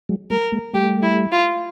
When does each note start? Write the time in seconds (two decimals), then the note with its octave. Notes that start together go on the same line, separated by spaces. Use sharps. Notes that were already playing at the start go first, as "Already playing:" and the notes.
0.09 F#3 G#3
0.30 G3 A3 A#4
0.52 G#3 A#3
0.73 G3 A3 G4
1.03 E4
1.32 F4